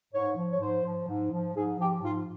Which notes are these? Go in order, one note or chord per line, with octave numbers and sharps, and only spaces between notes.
G#2 C#5
F3
C#5
G#2 C5
F3
G#2
F3
G#2 G#4
F3 G4
G#2 F4